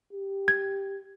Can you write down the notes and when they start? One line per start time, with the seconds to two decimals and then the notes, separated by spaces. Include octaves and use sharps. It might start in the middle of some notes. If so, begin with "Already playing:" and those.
0.13 G4
0.48 G#6